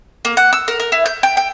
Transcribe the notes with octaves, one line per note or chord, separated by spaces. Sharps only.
A#3
F#5
E6
A#4
A#4
E4
G6
G5
G5